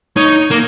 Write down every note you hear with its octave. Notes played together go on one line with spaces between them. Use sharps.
D#4 C#5
A#3